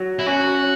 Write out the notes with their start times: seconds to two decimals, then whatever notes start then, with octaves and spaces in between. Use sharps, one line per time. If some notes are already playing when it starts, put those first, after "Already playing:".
Already playing: F#3
0.19 E4
0.26 C#4 F#4